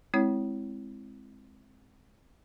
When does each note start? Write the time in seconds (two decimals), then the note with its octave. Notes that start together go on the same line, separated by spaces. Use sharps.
0.14 G#3 C4 E4 C#5